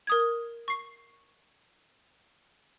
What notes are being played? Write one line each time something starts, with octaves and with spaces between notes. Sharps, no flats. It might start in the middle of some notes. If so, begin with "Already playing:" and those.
A#4 D#6 G#6
C#6 C7